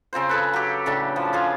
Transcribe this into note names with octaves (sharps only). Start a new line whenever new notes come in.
C#3 C4 F4 C5
G#4 A4 B4
F#3 G4
A2 C#3 D4 A5
F3
F4 G#4 F5